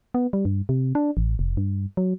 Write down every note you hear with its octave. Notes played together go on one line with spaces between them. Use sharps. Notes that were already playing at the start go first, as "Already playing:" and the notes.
B3
G3
G2
C3
D4
A1
F1
G2
F#3